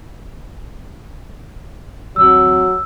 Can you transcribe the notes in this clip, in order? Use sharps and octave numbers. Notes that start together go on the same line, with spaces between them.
A1 D2 F#3 C4 E6